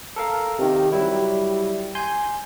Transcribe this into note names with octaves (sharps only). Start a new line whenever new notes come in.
A4 A#4 F5
C3 D#3 G4
F#3 G3 E4
G#5 C6 G6